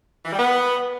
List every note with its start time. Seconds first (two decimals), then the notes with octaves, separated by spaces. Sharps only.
0.25 E3
0.32 G3
0.39 B3